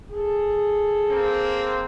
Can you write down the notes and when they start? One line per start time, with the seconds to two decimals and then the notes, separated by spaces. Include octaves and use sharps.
0.13 G#4 A4
1.09 A#3 C4